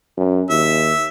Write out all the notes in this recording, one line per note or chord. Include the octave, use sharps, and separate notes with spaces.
F#2
D#2 E5